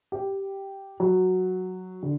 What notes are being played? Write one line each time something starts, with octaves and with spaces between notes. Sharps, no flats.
G4
F#3
D3